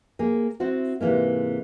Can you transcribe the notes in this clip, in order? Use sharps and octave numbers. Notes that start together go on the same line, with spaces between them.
A#3 G#4
C4 E4 F#4 C5
G#2 C3 E3 G#3 A#3